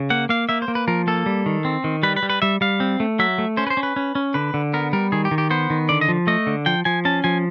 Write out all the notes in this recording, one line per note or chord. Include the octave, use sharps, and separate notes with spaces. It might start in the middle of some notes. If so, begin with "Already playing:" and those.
Already playing: C#3
A#3 F#5
A#3 F5
A#3 E5
C5
A#3
B4
F3 A#4
A#3 A4
G3
D#3
C4
D#3
G3 B4
B4
G3
B4
G3 E5
G3 F5
C4
A3
F#3 E5
A3
C#4 C5
B4
C5
C#4
B4
C#4
C#4
D3 B4
D3
B3 A#4
G3 A#4
D#3 G#4
G4
D#3
G4
B3 C5
D#3
D3 D5
D#5
F3
A3 D#5
D3
F3 G5
F3 G#5
C#4 A5
F3 G#5